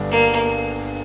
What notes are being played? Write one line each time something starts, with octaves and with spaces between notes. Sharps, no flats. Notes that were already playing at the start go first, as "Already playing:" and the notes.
Already playing: G1 G2 D3 G3 D4
A#3